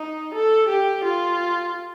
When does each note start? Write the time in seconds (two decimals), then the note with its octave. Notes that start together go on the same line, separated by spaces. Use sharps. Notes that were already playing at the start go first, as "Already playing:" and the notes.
Already playing: D#4
0.35 A4
0.69 G4
1.04 F4